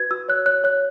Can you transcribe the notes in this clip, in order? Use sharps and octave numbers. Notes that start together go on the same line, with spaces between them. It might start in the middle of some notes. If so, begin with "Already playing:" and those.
Already playing: F#4 B4 G#6
F#4 E6
C#5 F#6
C#5 F#6
C#5 F#6